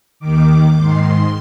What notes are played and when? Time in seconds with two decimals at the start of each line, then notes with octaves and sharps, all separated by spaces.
0.20 D#2 D#3 D6
0.77 G#2 D#3 C6